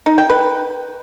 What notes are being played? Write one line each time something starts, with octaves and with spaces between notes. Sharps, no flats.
D#4
G5
B4